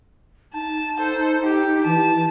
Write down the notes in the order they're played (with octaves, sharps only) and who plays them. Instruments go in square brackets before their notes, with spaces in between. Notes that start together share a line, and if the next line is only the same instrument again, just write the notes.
[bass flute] D#4 [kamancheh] A5
[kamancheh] A4 C5
G4
[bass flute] E3 [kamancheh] A5